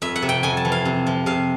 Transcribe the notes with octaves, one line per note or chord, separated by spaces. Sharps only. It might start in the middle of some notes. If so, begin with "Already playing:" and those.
F2 E5
F#5
C3
G5
F2 G#5
A5
E3
F5
C3
F3
C3 F5